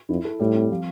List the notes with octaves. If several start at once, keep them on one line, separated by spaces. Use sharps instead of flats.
F2 E4
A4
A2 G3
C4
F3